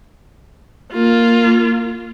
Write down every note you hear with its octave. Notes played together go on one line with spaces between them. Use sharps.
A#3 F4